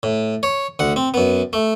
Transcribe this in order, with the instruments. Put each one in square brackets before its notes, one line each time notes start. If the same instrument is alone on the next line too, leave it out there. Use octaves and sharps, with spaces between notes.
[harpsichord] A2
C#5
D2 F#5
C4
F#2 B3
A3